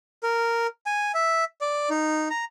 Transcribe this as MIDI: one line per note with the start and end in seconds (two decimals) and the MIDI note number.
0.23 0.67 70
0.86 1.12 80
1.14 1.44 76
1.61 1.89 74
1.90 2.29 63
2.30 2.45 82